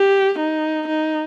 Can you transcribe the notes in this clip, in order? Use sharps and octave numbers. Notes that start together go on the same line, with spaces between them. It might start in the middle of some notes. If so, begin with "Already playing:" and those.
Already playing: G4
D#4
D#4